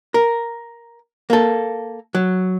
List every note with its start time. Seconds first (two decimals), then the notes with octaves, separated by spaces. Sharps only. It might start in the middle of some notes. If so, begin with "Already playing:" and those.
0.14 A#4
1.30 A#3 A4
2.15 F#3